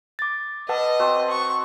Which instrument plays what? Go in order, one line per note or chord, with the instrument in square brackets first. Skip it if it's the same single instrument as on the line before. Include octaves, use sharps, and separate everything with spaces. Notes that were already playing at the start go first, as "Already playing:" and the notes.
[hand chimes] D6 A6
[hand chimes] B4 F#5 E6 [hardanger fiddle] D#5 [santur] A5
[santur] C4 F#4 C5
[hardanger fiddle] C#6